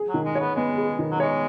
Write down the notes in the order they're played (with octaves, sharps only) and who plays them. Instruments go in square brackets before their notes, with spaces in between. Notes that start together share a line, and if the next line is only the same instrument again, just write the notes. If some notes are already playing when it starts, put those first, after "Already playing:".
Already playing: [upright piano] G#4
[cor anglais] F#3
[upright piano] D#3
[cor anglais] G#3
[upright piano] C#5
[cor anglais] B3
[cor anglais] G#3 [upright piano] B3
[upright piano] G#4
D#3
[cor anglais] F#3
[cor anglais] G#3 [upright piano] C#5